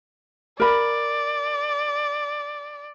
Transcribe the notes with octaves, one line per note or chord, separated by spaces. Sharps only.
A#4 D5 B5